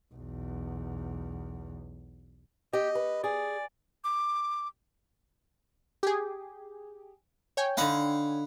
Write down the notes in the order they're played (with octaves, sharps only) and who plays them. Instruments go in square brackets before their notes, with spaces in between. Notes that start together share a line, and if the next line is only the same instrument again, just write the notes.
[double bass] B1 E2
[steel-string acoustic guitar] G4 [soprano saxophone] D#5
[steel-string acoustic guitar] B4
[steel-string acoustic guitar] G#4 [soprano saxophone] D5
[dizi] D6
[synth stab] G4 G#4
C#5 G5 G#5
[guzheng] D3 D#4 [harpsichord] F5 F#5 B5